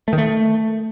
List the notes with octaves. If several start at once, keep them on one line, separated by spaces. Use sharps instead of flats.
A3
D#3
A3